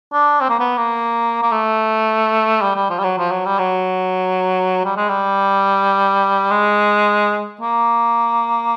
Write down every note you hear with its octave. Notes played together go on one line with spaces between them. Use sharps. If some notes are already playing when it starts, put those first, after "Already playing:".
D4
C4
A#3
B3
A#3
A#3
A3
G3
G3
F3
G3
F#3
F3
F#3
G3
F#3
G3
G#3
G3
G#3
A#3